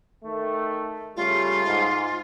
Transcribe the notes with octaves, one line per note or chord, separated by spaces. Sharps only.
D#3 A3
C#3 G3 A3 F4
G#2